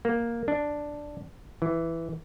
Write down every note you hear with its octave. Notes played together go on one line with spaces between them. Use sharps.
A#3
D4
E3